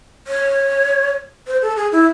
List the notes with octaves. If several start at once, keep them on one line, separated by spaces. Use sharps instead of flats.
C#5
C5
A4
G#4
E4